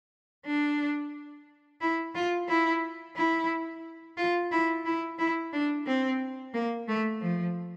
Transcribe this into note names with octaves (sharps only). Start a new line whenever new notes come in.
D4
E4
F4
E4
E4
F4
E4
E4
E4
D4
C4
A#3
A3
F3